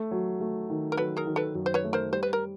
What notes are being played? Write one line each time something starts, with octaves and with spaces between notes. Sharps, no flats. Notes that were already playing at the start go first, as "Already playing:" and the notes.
Already playing: A3 A4
F#3
A3
D#3
A#4
F#3 A4 B4
G#4 A#4
D#3
A4 B4
F#2
C5
B4 C#5
A3
A#4 C5
G3 C5
B4
A#4